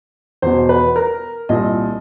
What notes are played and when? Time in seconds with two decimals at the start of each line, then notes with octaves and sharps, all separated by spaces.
0.42 E2 B2 C5
0.69 B4
0.96 A#4
1.49 C2 A#2 D#5